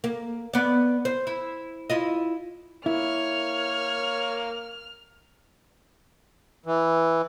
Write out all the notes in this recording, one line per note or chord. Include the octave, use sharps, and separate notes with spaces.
A#3
B3 D5
C5
E4
E4 F4 D#5
A#3 E4 C#5 F6
E3